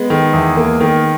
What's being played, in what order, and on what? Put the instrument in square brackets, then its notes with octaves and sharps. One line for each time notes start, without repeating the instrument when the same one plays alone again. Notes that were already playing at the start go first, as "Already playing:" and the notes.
Already playing: [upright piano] G#3 B3
[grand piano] D#3
E2
A#3
D#3